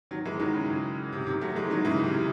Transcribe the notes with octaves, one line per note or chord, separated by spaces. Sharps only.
D#3 F#3
E3 G#3
D#3 F#3
C#3
C#3
C3
C3 D#3
F#3 A3
E3 G#3
D#3 F#3
C#3 E3
C3 D#3